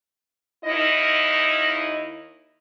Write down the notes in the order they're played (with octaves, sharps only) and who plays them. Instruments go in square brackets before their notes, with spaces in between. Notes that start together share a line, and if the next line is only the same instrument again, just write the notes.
[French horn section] D#2 D#4 E4 D#5